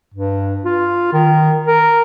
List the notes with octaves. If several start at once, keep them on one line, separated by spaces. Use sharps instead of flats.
G2
F4
D#3
A#4